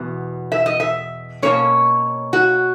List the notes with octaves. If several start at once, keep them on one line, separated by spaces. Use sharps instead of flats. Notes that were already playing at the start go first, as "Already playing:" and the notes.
Already playing: E2 B2 B3
E5
D#5
E5
B2 A#3 C#4 C#5
F#4